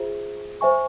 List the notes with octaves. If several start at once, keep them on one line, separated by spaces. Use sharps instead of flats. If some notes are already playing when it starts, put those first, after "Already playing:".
Already playing: F4 G#4 C5 E5
C5 E5 G#5 C#6